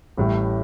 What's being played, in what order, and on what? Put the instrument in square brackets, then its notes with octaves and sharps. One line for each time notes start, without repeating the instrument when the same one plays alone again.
[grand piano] A1 A2 G3